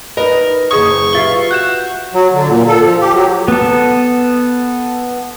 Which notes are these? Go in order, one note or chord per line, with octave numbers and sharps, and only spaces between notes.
D#4 A#4 B4 D#5
F#1 G#4 C#6 D#6 G#6
F4 G4 E5 F5 A6 G7
F#4 F#6 G6 E7
F#3
D3
A#2
A4
F3
G4
F#3
B3 A4